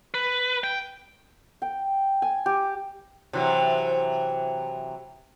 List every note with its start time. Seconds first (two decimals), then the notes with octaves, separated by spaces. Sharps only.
0.14 B4
0.64 G5
1.62 G5
2.22 G#5
2.46 G4
3.33 C3 E3 F#3